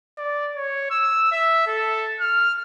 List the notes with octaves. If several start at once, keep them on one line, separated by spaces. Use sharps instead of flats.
D5
C#5
E6
E5
A4
F6